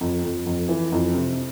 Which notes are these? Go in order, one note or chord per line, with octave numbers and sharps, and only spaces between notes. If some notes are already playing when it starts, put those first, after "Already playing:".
F2
F2
F2
E3
F2
C3